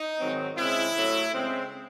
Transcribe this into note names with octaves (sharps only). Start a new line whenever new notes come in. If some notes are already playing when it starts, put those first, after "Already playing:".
Already playing: D#4
G#2 D#3 F#3 C4
C#3 G#3 C4 E4
A2 F#3 A3
C#3 G#3 C4